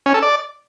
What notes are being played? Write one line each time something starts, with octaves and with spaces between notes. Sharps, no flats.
C#4
A4
D5